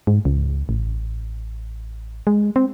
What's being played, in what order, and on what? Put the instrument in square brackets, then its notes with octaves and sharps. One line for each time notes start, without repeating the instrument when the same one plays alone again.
[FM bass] G#2
C#2
A1
G#3
C4